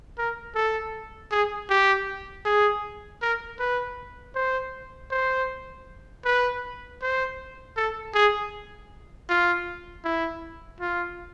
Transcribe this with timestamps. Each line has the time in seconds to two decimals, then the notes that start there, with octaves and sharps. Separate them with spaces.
0.18 A#4
0.55 A4
1.31 G#4
1.70 G4
2.45 G#4
3.22 A#4
3.59 B4
4.35 C5
5.11 C5
6.25 B4
7.01 C5
7.77 A4
8.14 G#4
9.29 F4
10.05 E4
10.80 F4